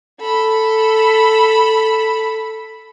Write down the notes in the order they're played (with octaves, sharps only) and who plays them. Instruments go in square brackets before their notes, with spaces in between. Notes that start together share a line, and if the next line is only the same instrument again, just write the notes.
[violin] A4 B5